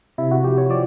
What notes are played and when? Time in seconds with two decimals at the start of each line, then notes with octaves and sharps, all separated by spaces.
0.18 C3 E4
0.31 F#4
0.44 F3 G4
0.58 C#5
0.70 F3 D5